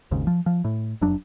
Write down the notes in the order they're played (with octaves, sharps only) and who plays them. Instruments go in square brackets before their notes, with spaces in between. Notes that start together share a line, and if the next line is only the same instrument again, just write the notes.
[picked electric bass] G#1 D#2 G#2 C#3
F3
F3
A2
F1 F#2 F#3 D4